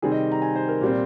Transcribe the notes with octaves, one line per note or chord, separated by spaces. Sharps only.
C3 D#3 G3 C4 G#4
D#5
A#5
G#5
C5
A#4
A#2 G3 C4